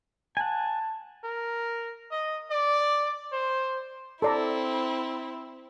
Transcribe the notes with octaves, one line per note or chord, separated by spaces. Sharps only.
F#5 G#5 A5
A#4
D#5
D5
C5
C4 E4 A4 D5 A#5